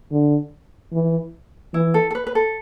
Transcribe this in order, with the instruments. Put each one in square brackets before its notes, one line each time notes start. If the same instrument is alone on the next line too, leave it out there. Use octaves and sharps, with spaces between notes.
[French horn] D3
E3
[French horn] E3 [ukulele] E4
[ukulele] A4
A4
B4
B4
A4